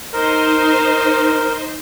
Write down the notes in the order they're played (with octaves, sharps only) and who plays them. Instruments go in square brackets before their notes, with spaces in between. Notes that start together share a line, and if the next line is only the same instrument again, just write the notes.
[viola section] D#4 C5 [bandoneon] A#4